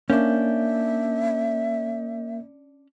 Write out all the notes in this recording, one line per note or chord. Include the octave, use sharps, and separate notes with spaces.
A#3 C#4 D4 E5 G6